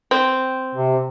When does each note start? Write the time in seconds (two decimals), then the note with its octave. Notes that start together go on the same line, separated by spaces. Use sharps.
0.11 C4
0.75 C3